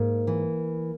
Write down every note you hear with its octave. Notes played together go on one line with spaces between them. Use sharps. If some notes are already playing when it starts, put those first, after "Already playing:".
Already playing: G#2 A#3
E3